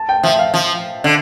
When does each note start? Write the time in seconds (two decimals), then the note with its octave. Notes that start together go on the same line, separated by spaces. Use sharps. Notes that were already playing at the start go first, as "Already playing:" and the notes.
Already playing: A5
0.09 G5
0.23 F3 E5
0.39 F5
0.54 F3
1.04 D3